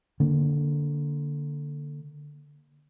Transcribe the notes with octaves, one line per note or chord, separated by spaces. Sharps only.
D3 A#3